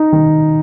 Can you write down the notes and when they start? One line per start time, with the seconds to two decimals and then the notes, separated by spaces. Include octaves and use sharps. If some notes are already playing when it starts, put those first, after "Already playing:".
Already playing: D#4
0.12 D#3